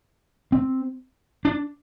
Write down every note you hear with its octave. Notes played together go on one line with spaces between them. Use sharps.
C4
D4